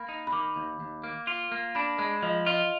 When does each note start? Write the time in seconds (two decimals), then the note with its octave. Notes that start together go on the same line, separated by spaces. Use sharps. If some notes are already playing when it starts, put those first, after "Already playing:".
Already playing: A#3 B5
0.09 D#4
0.27 B5
0.33 D#3 D6
0.56 D#2
0.80 D#2
1.04 A#3
1.27 F4
1.52 A#3
1.75 D4 B5
1.99 G#3 B5
2.23 F3 D#5
2.46 F4 D#5